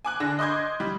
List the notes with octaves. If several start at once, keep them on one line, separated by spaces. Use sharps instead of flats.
G#5 D6 F#6
D3 D4 A#6
D#5 C6 D6 G6 G#6
G3